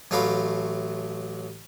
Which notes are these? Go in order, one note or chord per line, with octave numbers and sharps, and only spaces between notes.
A1 F#3 A3 F5 B5 D6